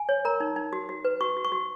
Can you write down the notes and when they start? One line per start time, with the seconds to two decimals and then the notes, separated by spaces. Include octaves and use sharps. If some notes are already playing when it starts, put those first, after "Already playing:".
Already playing: G#5
0.09 C#5
0.25 A#4 A#5
0.40 D#4
0.56 D#4
0.73 F#4
0.89 F#4
1.05 B4
1.21 F#4 C#6
1.37 F#4
1.45 C#6
1.52 F#4